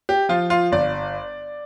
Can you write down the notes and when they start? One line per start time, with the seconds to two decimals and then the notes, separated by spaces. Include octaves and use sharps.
0.09 G4
0.29 F3 F4
0.50 F4
0.72 G1 D5